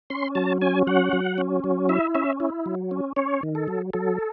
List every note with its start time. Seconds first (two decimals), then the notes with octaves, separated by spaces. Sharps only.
0.10 C#4 C6
0.35 F#3 A5
0.61 C#4 G#5
0.87 F#3 F#5
1.13 F#3
1.38 C#4
1.64 F#3
1.89 E4 E5
2.15 C#4 E5
2.40 E4
2.66 F#3
2.91 C#4
3.16 C#4 C#5
3.43 D#3
3.55 A4
3.68 F#3
3.94 F#3 A4